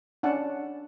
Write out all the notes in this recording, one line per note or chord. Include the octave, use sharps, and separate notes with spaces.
C#4 D4 F#5 A5